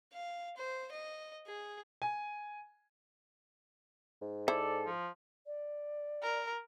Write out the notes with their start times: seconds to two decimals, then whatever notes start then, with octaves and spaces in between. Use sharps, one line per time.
0.13 F5
0.57 C5
0.92 D#5
1.47 G#4
2.02 G#5
4.22 G#2
4.48 E4 A4 C5 D5
4.86 F3
5.47 D5
6.22 A#4